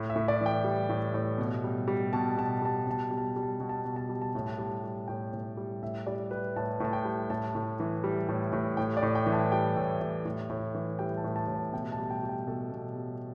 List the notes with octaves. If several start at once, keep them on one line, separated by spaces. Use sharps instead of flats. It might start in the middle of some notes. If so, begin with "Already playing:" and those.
Already playing: A2
E5
A2
D5
E3 G5
G3
A2
A2
B2
G3
G3
B2 A5
B2 A5
G3 A5
B2 A5
G3
A5
G3
A5
B2
A5
B2
A5
G3
A5
A2
A5
G3
G3
A2 G5
A2
G3
A2 E5
G3 D5
G3 B4
A2 A5
A2 A5
G5
G3
A2 A5
A2
E3
G3
A2
A2
A2 G5
D5
A2
G5
E3
A5
G3 G5
A2
A2
A2
A2
E3
G3 G5
A5
A2
A5
A2
A5
B2 G5
A5
G3
G5
G3
G5
B2 A4
B2
G3